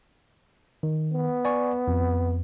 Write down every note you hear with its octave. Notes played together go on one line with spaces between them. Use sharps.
D#3
B3
D5 G#5 C#6
F2